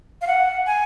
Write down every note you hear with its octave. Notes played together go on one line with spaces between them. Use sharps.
F5
F#5
G#5